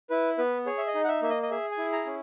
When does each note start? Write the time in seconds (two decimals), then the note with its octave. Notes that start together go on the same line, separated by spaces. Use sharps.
0.10 E4 B4
0.38 B3 B4
0.66 G#4 C#5
0.78 E5
0.87 D#5
0.94 D#4
1.04 F#5
1.08 E5
1.22 A#3 E5
1.30 D#5
1.43 D#5
1.51 G#4 E5
1.71 G#5
1.78 E4
1.93 A#5
2.06 C#4